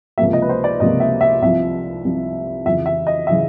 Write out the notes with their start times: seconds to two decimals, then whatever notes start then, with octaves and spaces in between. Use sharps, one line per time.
0.18 C#2 C3 F3 A#3 E5
0.33 D#5
0.42 B4
0.49 C5
0.64 D5
0.80 C#2 C3 F3 A#3 D#5
1.00 E5
1.21 E5
1.42 C2 C3 F3 E5
2.04 C2 C3 F3
2.65 F2 C#3 E3 E5
2.86 E5
3.07 D#5
3.27 C#3 E3 E5